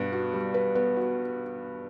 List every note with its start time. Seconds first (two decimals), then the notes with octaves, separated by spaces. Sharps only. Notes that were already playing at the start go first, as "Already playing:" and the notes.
Already playing: G2 B2 B3 B4
0.12 F#4
0.34 G3
0.54 B4
0.75 B3
0.97 F#4